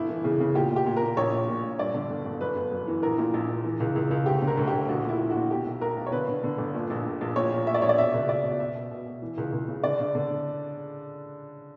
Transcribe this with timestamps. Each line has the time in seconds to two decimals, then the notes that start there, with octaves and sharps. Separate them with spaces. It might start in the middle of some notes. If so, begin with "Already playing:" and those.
Already playing: G1 E4
0.09 E3
0.24 C#3
0.40 C#3
0.55 A#2 G4
0.71 A#2
0.76 G4
0.86 A#2
0.97 A#4
1.02 A#2
1.17 A#1 C#5
1.32 A#2
1.48 A#2
1.63 A#1
1.79 G2 D5
1.94 D3
2.10 G1
2.26 G1
2.41 F#2 B4
2.56 G1
2.72 F#2
2.87 E3
3.03 A#1 A#4
3.18 A#2
3.34 A#1
3.50 A#1
3.65 E3
3.80 C#2
3.96 C#2
4.11 C#2
4.26 D2 G4
4.42 D3
4.47 A#4
4.58 D2
4.67 G4
4.73 D2
4.88 A#1 F#4
5.04 A#2 E4
5.19 A#1
5.30 A#2 F#4
5.51 B2 G4
5.66 B1
5.81 B1 A#4
5.97 B1
6.06 C#5
6.12 D3 B4
6.28 D3
6.43 D3
6.58 G1
6.74 A#2
6.90 A#1
7.05 A#1
7.21 A#1
7.36 A#2 C#5
7.52 A#2
7.67 A#2 E5
7.74 D5
7.82 A#1 C#5
7.89 D5
7.98 B2 E5
8.14 C#2
8.29 B2 D5
8.45 B2
8.60 B2 E5
8.75 B2
8.91 B2
9.06 B2
9.22 E3
9.38 C#2
9.53 C#2
9.68 C#3
9.84 D3 D5
9.99 D3
10.15 D3